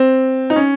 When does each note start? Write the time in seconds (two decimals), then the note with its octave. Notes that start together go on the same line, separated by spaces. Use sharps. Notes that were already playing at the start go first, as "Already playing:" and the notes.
Already playing: C4
0.50 D#4
0.56 C#4